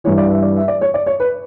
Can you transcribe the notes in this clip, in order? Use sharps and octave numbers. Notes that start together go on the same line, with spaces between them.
G2 E3 C#5
D5
E5
D5
E5
D5
C#5
D5
C#5
B4